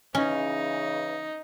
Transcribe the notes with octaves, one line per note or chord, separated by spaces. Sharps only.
C#3 E3 C#4 D#4